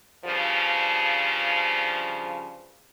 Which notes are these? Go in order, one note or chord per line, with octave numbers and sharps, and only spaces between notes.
G2 C#3 F3